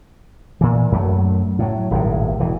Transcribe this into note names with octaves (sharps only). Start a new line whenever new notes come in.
A#2 E3
F#2 F#3 A3
A2 F#3
D#1 G#1 A2
E1 E3